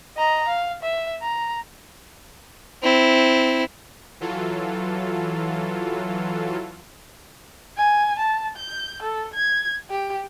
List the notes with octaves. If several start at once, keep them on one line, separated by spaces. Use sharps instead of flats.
D#5 A#5
F5
E5
A#5
C4 E4
E3 F#3 F4 A4
G#5
A5
G6
A4
G#6
G4